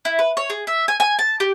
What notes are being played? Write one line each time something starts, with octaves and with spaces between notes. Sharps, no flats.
E4
B4
C#5
G#4
E5
G#5
G#5
A5
G4